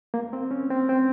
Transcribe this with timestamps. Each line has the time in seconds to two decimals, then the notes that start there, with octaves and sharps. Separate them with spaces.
0.14 A#3
0.33 C4
0.51 C#4
0.70 C4
0.89 C4